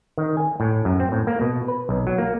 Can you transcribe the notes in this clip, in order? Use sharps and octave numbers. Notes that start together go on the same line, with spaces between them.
D#3
G#5
A2
F#2
C4
A2
A#3
B2
B4
B1
F#3
A#3